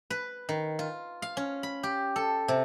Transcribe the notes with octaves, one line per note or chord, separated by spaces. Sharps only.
B4
D#3
F4
F5
C#4
B5
G4
A4
C3